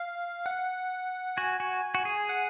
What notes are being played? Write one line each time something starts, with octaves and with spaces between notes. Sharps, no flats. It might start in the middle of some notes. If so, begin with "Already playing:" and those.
Already playing: F5
F#5
F#4 G#5
F#4
F#4
G#4
F#5